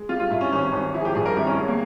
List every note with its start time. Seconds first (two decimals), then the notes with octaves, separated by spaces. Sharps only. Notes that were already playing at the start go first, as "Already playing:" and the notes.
Already playing: G#3
0.09 G3 F4
0.20 F4
0.30 G2 E4
0.41 C#4
0.52 G#1 C#4
0.73 G#1
0.94 F3 E4
1.00 G#4
1.05 G4
1.15 G2 G#4
1.26 A#4
1.36 G#1 E4
1.47 C#4
1.57 G#3
1.68 A#3